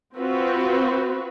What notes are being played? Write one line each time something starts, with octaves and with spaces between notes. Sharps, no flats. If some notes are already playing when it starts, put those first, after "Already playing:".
C4 F4 F#4 B4